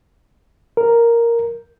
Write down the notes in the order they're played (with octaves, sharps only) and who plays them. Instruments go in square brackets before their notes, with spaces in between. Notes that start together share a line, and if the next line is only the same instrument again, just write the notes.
[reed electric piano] A#4